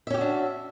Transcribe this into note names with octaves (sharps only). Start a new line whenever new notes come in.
C#4 D4 F#4 G4 E5